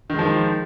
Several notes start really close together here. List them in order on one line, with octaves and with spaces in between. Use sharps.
D#3 G#3 F3